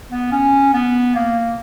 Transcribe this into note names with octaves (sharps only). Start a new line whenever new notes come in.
B3
C#4
B3
A#3